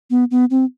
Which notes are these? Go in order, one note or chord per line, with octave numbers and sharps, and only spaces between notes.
B3
B3
C4